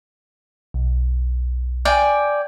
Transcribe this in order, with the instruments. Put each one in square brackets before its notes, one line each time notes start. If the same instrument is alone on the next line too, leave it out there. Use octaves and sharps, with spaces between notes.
[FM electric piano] B1
[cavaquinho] D5 G5 G#5